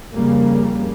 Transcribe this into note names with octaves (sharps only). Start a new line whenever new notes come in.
F2 C#3 G3 A#3